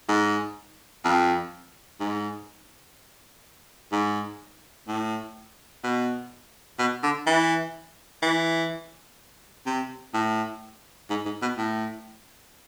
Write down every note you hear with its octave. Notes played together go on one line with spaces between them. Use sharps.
G#2
F2
G#2
G#2
A2
B2
B2
D3
E3
E3
C3
A2
G#2
G#2
B2
A2